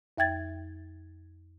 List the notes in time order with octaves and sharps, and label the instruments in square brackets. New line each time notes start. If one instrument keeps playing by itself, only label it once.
[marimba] F2 E5 G5 G#6 A6